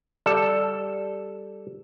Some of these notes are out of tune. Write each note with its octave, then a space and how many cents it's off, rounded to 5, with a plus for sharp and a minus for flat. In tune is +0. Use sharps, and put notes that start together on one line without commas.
G3 +0 A4 +0 D5 +0